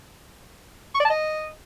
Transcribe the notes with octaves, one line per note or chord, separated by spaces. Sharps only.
C#6
D5
A5
D#5